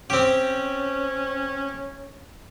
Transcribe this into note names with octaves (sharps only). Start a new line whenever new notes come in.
C4 C#4 G4